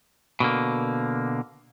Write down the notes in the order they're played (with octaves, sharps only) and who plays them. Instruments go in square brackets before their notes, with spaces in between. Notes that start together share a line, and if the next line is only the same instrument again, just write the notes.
[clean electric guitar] B2 D3 A#3